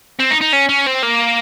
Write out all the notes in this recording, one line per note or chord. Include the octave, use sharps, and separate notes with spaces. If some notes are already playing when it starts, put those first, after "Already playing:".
C4
D#4
D#4
C#4
C#4
C4
A#3